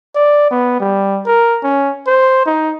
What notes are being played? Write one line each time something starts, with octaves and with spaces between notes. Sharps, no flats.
D5
B3
G3
A#4
C#4
C5
D#4